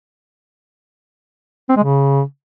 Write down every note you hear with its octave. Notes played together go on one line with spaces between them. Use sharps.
C4
G#3
C#3